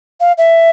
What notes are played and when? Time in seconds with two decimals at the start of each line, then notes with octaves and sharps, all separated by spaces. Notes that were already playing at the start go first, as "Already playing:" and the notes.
0.20 F5
0.37 E5